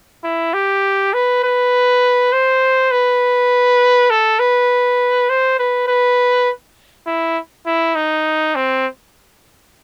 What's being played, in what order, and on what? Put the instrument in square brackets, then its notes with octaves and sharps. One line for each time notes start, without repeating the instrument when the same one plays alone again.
[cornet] E4
G4
B4
B4
C5
B4
A4
B4
C5
B4
B4
E4
E4
D#4
C4